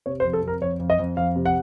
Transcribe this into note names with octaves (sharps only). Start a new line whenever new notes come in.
C3 C#5
C5
F2
A4
F2
A#4
F2 C#5
F2
D#5
F2
F2 F5
C3
F#5